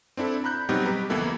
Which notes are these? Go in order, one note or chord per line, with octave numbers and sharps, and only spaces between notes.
C4 D4 E4 A4
A#5 B5 F#6 G6
B2 F#3 G3 C4 D#4 G4
G4 B4 A#5
C#2 E3 A#3 B3 E4 A4